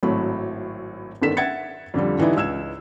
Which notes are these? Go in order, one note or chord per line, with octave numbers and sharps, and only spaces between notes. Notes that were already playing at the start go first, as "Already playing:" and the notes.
G#1 A2 F#3 A3 B5
G1 D3 D#3 A4 B6 E7
E5 F#5 G#6 A6 C#7
F2 D3 F3 G3
D3 E3 G3 D#4 E4
C#2 E6 G#6 E7